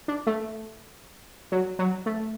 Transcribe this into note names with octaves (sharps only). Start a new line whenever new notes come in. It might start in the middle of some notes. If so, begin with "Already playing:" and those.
D4
A3
F#3
F#3
A3